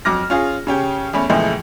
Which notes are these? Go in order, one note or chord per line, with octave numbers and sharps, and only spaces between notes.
F2 F#3 D6 F6 A#6
C#4 F4 G#4
C#3 C#4 G4
E2 A3 C#4 B5
C#2 A#2 E3 F3 G#3 A3